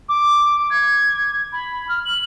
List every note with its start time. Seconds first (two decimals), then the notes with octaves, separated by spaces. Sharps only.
0.09 D6
0.70 G#6
1.53 B5
1.89 F6
2.05 F#7